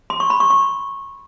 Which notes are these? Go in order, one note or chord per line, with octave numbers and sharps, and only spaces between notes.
C6
C#6
B5
C#6
C#6